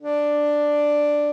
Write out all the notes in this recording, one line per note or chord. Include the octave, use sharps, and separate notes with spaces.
D4